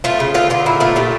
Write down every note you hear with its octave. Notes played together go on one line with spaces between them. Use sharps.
A3 F4
C#3
D3 F4
D3 F4
A#2 E4
A3 F4
A#2 G4